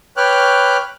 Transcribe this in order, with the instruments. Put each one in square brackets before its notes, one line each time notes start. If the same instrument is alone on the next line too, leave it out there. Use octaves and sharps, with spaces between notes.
[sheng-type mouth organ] B4 C#5 G5 D6 F6 F#6